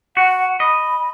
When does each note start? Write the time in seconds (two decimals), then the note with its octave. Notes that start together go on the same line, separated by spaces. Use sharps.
0.17 F#4 F#5
0.60 D#5 B5